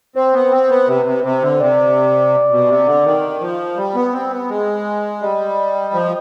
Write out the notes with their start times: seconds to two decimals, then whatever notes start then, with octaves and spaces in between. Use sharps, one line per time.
0.15 C4 C5
0.33 B3
0.51 C4
0.69 B3
0.87 C3 B4
1.06 C3
1.23 C3 C5
1.42 D3
1.60 C3 D5
2.50 B2
2.68 C3
2.86 D3
3.05 D#3
3.40 F3
3.77 G3
3.95 B3
4.13 C4
4.31 B3
4.49 G#3
5.21 G3 D#5
5.94 F3